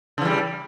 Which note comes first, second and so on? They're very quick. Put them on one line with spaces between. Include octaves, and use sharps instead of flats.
C#3 E3 G3